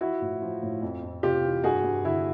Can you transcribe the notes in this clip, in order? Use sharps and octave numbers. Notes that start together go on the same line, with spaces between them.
F3 E4 F#4
A2
F3
A2
F2
F2
C3 F4 G4
E3
G2 F#4 G#4
G2
D3 E4 F#4